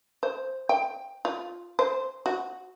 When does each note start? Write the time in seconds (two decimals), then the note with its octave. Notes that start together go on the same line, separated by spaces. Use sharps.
0.23 C5
0.69 G5
1.25 F4
1.79 C5
2.26 F#4